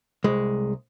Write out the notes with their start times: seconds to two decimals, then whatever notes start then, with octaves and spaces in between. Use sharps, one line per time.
0.24 C2 G#3